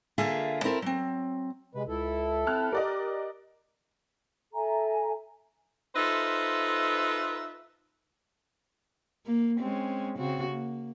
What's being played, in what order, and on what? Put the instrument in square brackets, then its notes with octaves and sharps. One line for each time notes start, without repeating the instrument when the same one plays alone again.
[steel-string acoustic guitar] D3 A#3 F4 G#4 E5 F5
C4 E4 A4 A#4
F#3 C4
[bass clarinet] C3 [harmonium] G#3 B4
[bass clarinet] C#2 [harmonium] E4 A4
[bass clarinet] C4 [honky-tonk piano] A5 F6 F#6
[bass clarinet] G4 [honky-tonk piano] A#4 D5 D#5
[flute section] A4 E5 G#5 A#5
[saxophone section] D#4 F4 A4 B4 C5 E5
[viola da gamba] A#3
G#3 C4 C#4
C#3 C4 F#4
A#3